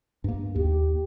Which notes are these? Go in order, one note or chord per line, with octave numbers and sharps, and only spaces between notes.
G2 A#3
D#2 G4